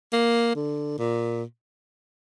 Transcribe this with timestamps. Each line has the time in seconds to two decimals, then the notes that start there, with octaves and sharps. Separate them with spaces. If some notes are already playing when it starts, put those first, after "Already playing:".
0.13 A#3
0.56 D3
0.99 A#2